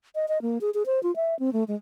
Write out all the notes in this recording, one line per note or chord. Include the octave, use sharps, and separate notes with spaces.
D#5
D#5
A#3
G#4
G#4
C5
F4
E5
C4
A3
G#3